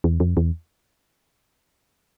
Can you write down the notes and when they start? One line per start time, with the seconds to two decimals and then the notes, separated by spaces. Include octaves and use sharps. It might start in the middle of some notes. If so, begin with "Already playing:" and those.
0.04 E2
0.20 F2
0.37 E2